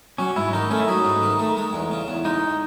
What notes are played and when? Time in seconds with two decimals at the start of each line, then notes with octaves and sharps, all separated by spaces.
0.18 F#3 C#4
0.36 G#2 E4
0.53 D#3 D#4
0.70 A3 C#4
0.80 E4
0.87 F#3 D#4
1.05 G#2
1.22 D#3
1.39 A3
1.57 G#3
1.73 E2
1.91 C#3
2.08 E2
2.25 G#3 D#4